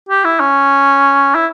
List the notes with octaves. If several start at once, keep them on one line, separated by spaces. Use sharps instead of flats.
G4
E4
C#4
E4